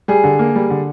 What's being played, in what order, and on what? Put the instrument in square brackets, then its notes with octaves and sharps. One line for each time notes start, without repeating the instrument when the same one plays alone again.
[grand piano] G3 [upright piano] G#4
[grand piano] D3
A#3
G3
D3